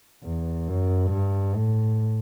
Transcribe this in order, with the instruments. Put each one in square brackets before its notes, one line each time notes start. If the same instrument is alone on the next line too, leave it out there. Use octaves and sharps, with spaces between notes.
[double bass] E2
F#2
G2
A2